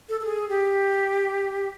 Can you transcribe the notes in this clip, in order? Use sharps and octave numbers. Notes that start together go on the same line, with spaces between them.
A4
A4
G#4
G4